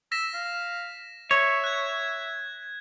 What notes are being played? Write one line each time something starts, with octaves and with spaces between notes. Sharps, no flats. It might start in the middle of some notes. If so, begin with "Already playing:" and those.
E6 A#6 B6 E7
F5
C#5 E5
F#6 G#6